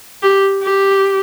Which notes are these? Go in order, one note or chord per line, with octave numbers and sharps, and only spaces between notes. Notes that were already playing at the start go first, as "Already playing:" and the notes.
G4
G4